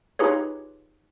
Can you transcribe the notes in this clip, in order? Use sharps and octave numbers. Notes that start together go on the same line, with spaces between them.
D#4 F4 G4 G#4 B4 C#5